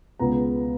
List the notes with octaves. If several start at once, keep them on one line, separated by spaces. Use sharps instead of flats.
C#2 B2 G#3 B3 A#5